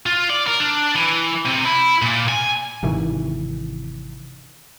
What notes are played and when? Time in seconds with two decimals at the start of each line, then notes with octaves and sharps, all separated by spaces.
0.06 F4
0.30 D5
0.47 A#4
0.60 D4
0.96 E3
1.46 C3
1.65 E4
2.02 A#2
2.29 G#5
2.83 G#1 C3 D#3 E3